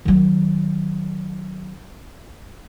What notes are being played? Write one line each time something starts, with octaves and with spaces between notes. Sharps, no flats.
D#3 F#3